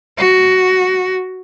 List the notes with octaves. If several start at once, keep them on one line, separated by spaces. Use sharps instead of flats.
F#4